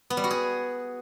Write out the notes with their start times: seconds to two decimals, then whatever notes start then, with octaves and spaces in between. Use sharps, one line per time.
0.10 B3
0.17 G3
0.24 F#4
0.31 G#4